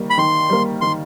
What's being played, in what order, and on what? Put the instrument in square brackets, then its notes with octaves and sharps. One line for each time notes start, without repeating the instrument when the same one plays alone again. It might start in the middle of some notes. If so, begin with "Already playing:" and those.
Already playing: [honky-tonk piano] D#3 G3 A#3
[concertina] B5
[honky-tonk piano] D#3 [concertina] C6
[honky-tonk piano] G3 A#3
[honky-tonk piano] D#3 [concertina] C6